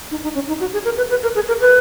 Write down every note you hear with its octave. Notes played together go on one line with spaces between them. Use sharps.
D#4
D#4
C#4
D#4
F#4
G#4
A#4
B4
B4
A#4
G#4
A#4
B4